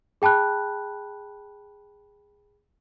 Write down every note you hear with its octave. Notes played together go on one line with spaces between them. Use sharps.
G#4 G5 A5 B5 F#6